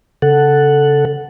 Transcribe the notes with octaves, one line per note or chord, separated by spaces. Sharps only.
C#3 A4 F#5